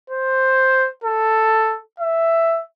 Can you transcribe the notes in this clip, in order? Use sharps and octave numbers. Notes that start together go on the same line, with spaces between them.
C5
A4
E5